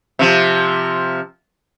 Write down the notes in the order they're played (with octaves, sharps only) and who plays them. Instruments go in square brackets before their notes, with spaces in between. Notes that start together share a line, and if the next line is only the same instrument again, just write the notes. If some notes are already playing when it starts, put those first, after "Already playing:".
[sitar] C3 F3